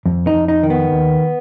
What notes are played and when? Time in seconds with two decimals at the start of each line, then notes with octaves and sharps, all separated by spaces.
0.06 F2
0.27 D#4
0.34 F2
0.48 D#4
0.63 D#3
0.70 B3
0.92 D#2